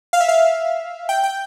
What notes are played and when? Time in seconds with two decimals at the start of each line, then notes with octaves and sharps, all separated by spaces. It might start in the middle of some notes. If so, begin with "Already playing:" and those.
0.13 F5
0.20 E5
0.29 F5
1.09 G5
1.24 G5